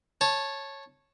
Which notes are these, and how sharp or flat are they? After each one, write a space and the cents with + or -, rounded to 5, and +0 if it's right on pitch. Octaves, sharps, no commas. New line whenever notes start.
C#5 -10 A5 -5